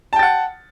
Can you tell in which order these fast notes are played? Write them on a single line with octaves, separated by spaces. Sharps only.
A5 G5 A6 F#5